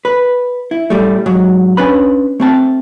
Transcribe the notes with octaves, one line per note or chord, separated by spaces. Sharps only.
B4
E4
A2 G3 A3
G#2 F#3
C#4 D4 B4 B5
A3 C4 A5